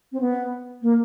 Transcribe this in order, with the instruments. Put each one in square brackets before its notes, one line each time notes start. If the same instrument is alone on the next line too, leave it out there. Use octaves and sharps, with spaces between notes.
[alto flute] C4
B3
A#3